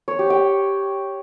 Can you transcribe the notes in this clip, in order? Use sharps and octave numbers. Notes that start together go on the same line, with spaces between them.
C#5
G4
G5